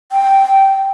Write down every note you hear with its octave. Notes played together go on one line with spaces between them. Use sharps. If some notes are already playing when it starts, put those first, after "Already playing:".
G5